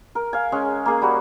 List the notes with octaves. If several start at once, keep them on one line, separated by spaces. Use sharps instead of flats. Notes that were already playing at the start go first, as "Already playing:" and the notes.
A#4
F5 G#5
G#3 C#4
A#3 G#4
G3 F#4